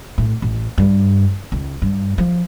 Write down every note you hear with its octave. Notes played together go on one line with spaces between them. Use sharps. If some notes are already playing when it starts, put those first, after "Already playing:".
A2
A1
G2
C#2
G2
F3